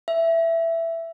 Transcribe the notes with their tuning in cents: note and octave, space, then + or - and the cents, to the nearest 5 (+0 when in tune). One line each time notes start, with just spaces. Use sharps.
E5 +10